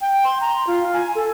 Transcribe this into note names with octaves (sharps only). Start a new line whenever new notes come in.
G5
C6
A#5
F4
G#5
A4